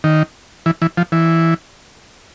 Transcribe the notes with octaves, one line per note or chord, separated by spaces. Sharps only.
D#3
E3
E3
F3
E3